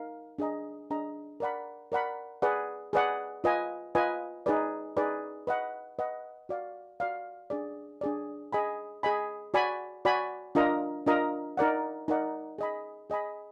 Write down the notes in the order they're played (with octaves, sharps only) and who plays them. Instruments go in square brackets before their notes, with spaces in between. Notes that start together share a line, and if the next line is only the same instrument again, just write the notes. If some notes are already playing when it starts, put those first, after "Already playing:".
Already playing: [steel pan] D#4 A#4 F5
D4 G#4 D#5 A#5
D4 G#4 D#5 A#5
A#4 D5 F#5 B5
A#4 D5 F#5 B5
G#4 B4 D5 F#5
G#4 B4 D5 F#5
F4 B4 D#5 G#5
F4 B4 D#5 G#5
D#4 G#4 B4 D5
D#4 G#4 B4 D5
B4 D#5 F#5
B4 D#5 F#5
F#4 D5 F5
F#4 D5 F5
D4 G#4 D5
D4 G#4 D5
G#4 D#5 G#5 B5
G#4 D#5 G#5 B5
F#4 D5 G#5 B5
F#4 D5 G#5 B5
D4 F4 A#4 D#5 A#5
D4 F4 A#4 D#5 A#5
D#4 A#4 D5 F#5
D#4 A#4 D5 F#5
G#4 D#5 G#5 B5
G#4 D#5 G#5 B5